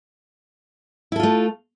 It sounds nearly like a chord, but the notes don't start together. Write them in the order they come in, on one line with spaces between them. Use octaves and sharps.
E4 A4 F4 A3